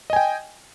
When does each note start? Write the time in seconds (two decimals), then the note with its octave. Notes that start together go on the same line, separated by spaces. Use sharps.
0.10 D#5
0.13 G#5
0.16 G5